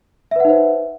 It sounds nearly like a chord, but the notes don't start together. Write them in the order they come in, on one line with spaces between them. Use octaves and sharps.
E5 B4 F#5 D#4 C5